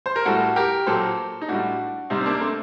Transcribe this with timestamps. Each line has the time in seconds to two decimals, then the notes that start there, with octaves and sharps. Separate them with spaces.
0.06 C5
0.16 A#4
0.25 A2 G3 F#4 A4
0.56 G4 A#4
0.87 A#2 F#3 A4 C5
1.41 D#4
1.48 A2 G3 D4 F#4
2.10 C3 G3 C4 D#4
2.21 C4
2.26 A#3 D4
2.41 A3 C4